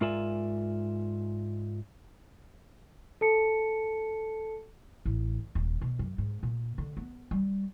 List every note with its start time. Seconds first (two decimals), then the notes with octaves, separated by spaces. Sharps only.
0.01 G#2 F4 A#4 D5 E5 G#5
3.21 A4 A5 C#7
5.05 A1
5.55 D#1
5.81 B2
5.99 F#2
6.18 G#2
6.43 A#2
6.78 D3
6.97 B3
7.31 G3